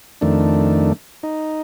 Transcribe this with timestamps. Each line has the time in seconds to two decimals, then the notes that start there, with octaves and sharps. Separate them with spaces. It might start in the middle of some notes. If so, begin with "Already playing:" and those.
0.21 F2 D#3 A3 D4
1.23 D#4